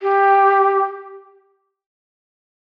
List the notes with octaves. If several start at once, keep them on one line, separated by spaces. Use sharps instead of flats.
G4